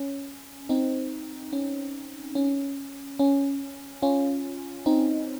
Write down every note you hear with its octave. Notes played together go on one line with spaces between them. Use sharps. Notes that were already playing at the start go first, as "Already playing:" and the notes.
Already playing: C#4
C4 D#4
C#4
C#4
C#4
C#4 F4
C4 D#4